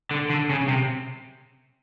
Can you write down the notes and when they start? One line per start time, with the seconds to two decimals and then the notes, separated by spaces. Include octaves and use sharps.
0.11 D3
0.30 D3
0.50 C#3
0.68 C3